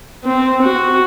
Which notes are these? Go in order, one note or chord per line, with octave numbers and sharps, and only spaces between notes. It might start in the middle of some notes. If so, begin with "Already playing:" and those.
C4
F#4